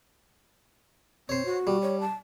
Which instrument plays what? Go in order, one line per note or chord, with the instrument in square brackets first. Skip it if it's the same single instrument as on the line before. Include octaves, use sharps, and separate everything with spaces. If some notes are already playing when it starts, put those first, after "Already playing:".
[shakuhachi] C4 [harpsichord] C5 C#5
[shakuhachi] F#4
[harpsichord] G3
[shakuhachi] C#5
A5